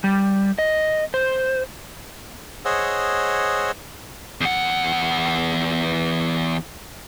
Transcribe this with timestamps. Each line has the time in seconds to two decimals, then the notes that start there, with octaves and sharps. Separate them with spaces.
0.04 G3
0.59 D#5
1.14 C5
2.65 G#4 C5 C#5 D#5 F#5 E6
4.41 E2 F#5